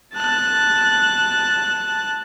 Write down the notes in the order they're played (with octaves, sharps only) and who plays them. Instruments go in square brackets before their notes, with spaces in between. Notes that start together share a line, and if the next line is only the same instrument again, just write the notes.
[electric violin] A5 F#6